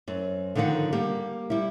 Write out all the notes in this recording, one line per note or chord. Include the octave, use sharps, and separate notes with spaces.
F#2 C4
D3 D#3 F3 D#4 F#5
G3 A#3 G4
G3 E4